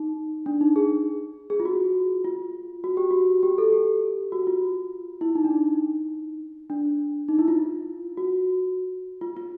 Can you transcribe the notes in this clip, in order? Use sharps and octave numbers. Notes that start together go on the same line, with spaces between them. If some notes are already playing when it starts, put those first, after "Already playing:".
Already playing: D#4
D4
D#4
G#4
G#4
F4
F#4
F4
F#4
G4
F#4
G4
A4
G4
F#4
F4
E4
D#4
D4
D#4
D4
D#4
E4
F4
F#4
F4
F4